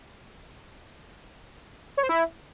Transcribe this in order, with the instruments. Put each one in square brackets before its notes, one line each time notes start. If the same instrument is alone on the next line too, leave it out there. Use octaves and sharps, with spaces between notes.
[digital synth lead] C#5
C5
E4